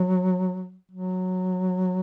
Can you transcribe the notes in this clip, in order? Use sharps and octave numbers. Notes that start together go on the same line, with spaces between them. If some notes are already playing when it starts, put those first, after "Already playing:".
Already playing: F#3
F#3